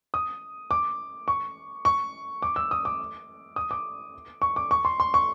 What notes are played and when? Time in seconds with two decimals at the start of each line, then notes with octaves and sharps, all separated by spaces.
0.14 D#6
0.71 D6
1.28 C#6
1.85 C#6
2.42 D6
2.56 E6
2.71 D#6
2.85 D6
3.56 D#6
3.71 D6
4.42 C#6
4.56 D6
4.71 C#6
4.85 C6
5.00 C6
5.14 C#6